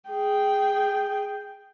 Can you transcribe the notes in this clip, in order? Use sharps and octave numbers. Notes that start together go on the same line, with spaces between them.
G#4 G5